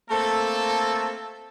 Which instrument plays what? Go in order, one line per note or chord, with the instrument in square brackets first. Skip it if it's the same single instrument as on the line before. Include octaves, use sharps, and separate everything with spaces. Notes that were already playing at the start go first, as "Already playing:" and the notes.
[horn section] A3 A#3 C4 A4